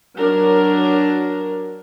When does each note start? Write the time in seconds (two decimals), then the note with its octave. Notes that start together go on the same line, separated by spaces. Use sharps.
0.18 F#3 D4 A#4